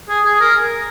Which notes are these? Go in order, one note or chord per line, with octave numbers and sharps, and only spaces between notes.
G#4
G#4
A#4